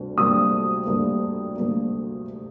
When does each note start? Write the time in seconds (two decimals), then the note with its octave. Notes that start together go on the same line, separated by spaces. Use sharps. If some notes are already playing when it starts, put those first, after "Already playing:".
Already playing: D2 C3 G3 D4
0.18 D2 C3 G3 A#3 D4 D#6
0.86 D2 C3 G3 A#3 D4
1.56 D2 C3 G3 A#3 D4